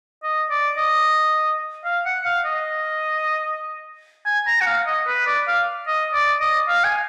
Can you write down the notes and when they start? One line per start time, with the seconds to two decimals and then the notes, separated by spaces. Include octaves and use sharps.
0.23 D#5
0.50 D5
0.77 D#5
1.85 F5
2.06 F#5
2.25 F5
2.45 D#5
4.26 G#5
4.47 A#5
4.61 F#5
4.66 F5
4.87 D#5
5.07 B4
5.26 D5
5.47 F5
5.87 D#5
6.14 D5
6.40 D#5
6.68 F5
6.84 G#5